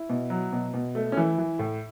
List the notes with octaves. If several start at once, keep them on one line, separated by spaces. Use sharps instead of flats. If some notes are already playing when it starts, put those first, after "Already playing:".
Already playing: E4
B2
F#3
B2
B2
A3
C#4
E3 E4
E3
A2